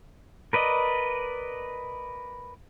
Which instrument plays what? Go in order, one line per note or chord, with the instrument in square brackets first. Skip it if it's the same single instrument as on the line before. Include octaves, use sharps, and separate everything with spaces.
[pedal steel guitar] A#4 B4 D5 D#5